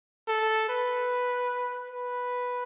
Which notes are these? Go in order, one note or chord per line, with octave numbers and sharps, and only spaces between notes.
A4
B4
B4